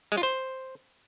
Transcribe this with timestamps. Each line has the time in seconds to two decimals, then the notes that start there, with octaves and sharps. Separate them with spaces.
0.12 G#3
0.17 F4
0.23 C5